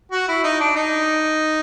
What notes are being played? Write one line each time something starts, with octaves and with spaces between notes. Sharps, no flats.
F#4
E4
D#4
D4
D#4